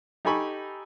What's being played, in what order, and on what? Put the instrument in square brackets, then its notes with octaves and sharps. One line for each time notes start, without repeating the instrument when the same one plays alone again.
[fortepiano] D#4 G4 A4 G#5 B5 C#6